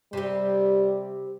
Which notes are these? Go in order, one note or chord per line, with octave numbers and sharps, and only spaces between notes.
C3 G3 G4